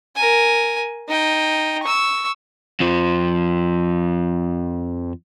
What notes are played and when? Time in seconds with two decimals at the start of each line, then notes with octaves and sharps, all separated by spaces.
0.16 A#4 G#5
1.08 D#4 G5
1.83 C#6 E6
2.80 F2 F3